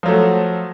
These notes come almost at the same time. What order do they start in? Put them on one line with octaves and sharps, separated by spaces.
F3 F#3 A3 F#4